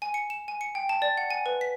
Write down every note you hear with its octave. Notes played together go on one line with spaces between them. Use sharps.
G#5
C#7
E7
G#5
C#7
G5
A5
D5
F#5
G#5
B4
B6